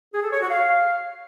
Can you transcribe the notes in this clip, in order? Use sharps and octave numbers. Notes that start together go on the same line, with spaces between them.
G#4
A4
C#5
F#4
F5